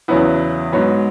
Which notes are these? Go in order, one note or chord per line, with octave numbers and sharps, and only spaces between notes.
E2 C#3 F#3 B3 E4
G#2 F#3 B3